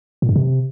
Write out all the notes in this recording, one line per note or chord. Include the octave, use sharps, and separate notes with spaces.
A#2
G2
C3